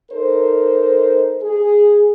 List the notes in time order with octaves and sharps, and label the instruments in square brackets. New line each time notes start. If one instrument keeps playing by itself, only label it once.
[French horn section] D#4 A4 A#4 C5
G#4